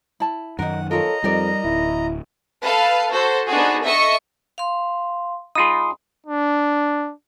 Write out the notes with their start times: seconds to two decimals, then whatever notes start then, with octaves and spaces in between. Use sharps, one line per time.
0.20 E4 A5
0.59 F#2 D#3 D#4 A#4 F#5
0.91 F4 A4 A#4 C#5 D#5 A#5
1.24 F2 G3 D#4 A#4 D5
1.64 D1 E4
2.64 A4 B4 F5 A5
3.13 F#4 A4 C5
3.48 B3 D4 D#4 F#4 G#4
3.84 A4 D#5 E5 C#6 C#7
4.58 F5 C6
5.55 D#4 F4 G#4 B5 C6 D#6
6.27 D4